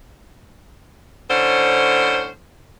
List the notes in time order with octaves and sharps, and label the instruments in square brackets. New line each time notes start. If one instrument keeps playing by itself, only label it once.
[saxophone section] A2 D3 C#4 C5